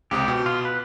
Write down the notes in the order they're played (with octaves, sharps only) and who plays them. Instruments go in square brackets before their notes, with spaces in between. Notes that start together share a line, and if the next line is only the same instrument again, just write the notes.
[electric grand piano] C#2 C3 D#6 [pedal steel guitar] G4
[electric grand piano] B2
[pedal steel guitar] F4
B4